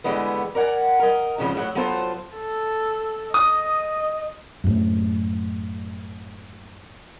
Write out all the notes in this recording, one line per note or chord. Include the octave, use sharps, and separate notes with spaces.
D3 E3 G3 G#3 B3
A#4 D5 F#5 G#5
A#4 D#5
F2 G#2 C#3 F3 G3
A2 F#3 F#5
F#3 B3 F4 A4 C5
A4
D#5 D#6
F#2 A2